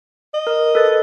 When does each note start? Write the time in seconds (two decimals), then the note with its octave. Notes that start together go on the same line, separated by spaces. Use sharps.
0.34 D#5
0.47 A#4
0.75 A4 B4 A6